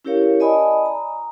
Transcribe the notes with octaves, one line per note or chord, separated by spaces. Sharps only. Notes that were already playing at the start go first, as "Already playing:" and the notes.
C#4 E4 G4 A#4 C#5 F5
D5 D#5 G#5 A5 B5 D#6
A#5